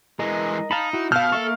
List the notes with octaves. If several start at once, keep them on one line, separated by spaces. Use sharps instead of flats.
E3 G#3 A#4 D#5
D#4 F5 A5 B5
E4 F#4
B2 F5 A5 E6 F6 G6
A#3 A4 E5 C#6